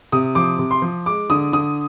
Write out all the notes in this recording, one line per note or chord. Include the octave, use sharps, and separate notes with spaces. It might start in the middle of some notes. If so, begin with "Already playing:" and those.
C3 D#6
F3 D6
C3
C6
F3
G#3 D6
D3 D#6
D3 D#6